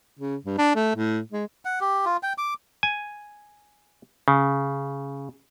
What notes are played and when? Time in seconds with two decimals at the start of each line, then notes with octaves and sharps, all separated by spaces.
0.19 C#3
0.45 G2
0.58 D4
0.75 A3
0.96 A2
1.32 G#3
1.65 F#5
1.81 G4
2.05 F4
2.23 G5
2.38 D6
2.83 G#5
4.28 C#3